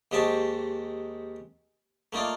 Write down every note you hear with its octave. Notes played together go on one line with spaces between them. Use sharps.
D#2 G#3 G4 C5 A5 C#6
A3 A#3 D#4 F4 D5